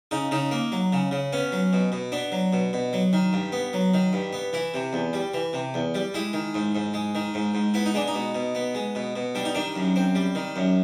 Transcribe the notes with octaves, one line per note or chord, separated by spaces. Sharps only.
C#3 D#4
C#3 D#4
A#3
F#3
C#3
C#3
B3 C#4
F#3
B2
B2
B3 D4
F#3
B2
B2
F#3
D#3
G2
B3
F#3
D#3
G2
B3
E3 E4
C3
E2
G3
E3
C3
E2
G3
G#3 E4
D#3
G#2
G#2
G#3
D#3
G#2
G#2
B3 E4
D#4
G#3 D4
D#4
B2
B2
B3
G#3
B2
B2
G3 D4
D#4
D#3 D4
F#2
C4
G3
D#3
F#2